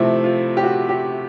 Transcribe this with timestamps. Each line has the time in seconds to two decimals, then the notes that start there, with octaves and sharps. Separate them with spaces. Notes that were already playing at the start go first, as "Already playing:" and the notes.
Already playing: C3 F3 A3 C4 E4
0.24 F4
0.57 G4
0.63 F#4
0.89 G4